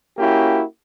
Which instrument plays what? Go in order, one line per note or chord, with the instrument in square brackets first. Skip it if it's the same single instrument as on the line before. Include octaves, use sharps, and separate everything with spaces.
[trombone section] A#3 C#4 E4 F#4 G4